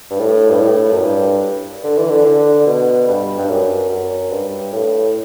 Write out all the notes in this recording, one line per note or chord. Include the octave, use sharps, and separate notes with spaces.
G2
A2
G2
A2
F#2
G2
D3
E3
D3
D3
B2
G2
G2
F#2
F#2
G2
A2